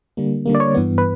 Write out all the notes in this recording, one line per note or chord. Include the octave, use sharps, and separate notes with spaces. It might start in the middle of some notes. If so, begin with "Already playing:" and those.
D3 G3 A#3
D3 G3 A#3
D5
C#5
G2 E3 B3
B4